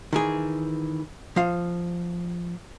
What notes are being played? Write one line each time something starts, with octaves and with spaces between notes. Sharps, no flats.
D#3 E3 G#4
F3 F5